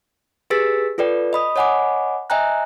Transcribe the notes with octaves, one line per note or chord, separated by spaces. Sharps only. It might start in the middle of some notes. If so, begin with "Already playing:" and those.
G4 G#4 B4 E6 A6 B6
F4 A4 B4 D5 G5
D#5 B5 D#6
C#5 D#5 F#5 G#5 B5 D6
D#5 E5 G5 G#5 A#5 F#6